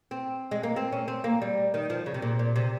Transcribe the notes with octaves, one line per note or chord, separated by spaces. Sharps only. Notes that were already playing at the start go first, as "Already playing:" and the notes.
C4
G#3
A#3
C4
C#4
C4
A#3
G3
D#3
F3
C#3
C3
A#2
A#2
C3